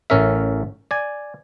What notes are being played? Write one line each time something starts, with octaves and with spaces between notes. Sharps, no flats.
A1 A2 C#4 A#4 E5
D5 G#5